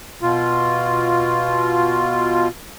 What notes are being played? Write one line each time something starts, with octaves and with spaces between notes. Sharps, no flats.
B2 F4